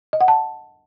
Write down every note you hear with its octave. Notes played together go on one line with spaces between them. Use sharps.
D#5
F#5
A5